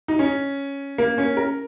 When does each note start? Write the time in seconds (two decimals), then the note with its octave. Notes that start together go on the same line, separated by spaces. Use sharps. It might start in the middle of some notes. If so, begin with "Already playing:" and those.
0.08 D#4
0.19 C#4
0.98 A#3
1.18 C#4
1.37 A#4